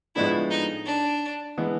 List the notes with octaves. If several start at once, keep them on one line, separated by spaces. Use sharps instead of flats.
A2 F3 G#3 B3 D4 E4
D#4
D4
E3 G#3 B3